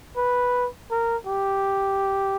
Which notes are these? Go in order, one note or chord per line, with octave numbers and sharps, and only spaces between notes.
B4
A#4
G4